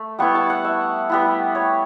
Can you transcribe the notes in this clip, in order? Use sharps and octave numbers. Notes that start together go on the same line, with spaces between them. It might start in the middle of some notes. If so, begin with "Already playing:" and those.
Already playing: A3
G3 B3 E4 C#6
A5
F#5
E5
G3 B3 E4
C#5